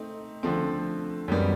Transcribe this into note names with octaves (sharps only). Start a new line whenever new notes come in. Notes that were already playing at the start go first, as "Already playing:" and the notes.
Already playing: A3 C4 D#4
D3 F3 A3 C4
F#2 D#3 G3 B3